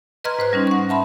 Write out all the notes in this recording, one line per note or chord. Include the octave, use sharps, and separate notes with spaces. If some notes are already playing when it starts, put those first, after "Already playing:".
B4 D#5 A#5 C6 F6 G#6
G#2 C5 F#6
G3 C#4 D#4
F#5 C#6
E5 A5 B5 C6